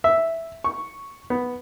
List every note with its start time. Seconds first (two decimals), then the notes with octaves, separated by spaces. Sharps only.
0.04 E5
0.64 C#6
1.30 B3